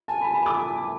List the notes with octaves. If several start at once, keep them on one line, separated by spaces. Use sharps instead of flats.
G#5 A5
B5
B5
D6